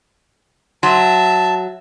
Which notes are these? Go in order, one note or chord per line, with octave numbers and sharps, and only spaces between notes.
F#3 E5 A5 C6